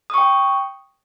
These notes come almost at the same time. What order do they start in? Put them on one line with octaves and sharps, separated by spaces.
D#6 C#6 G5